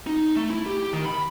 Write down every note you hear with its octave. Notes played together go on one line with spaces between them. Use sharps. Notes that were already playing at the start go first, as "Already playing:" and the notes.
D#4
A3
E4
G4
D#3
B5